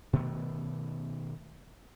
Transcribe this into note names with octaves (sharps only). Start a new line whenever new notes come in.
B2 D#3 A3 B3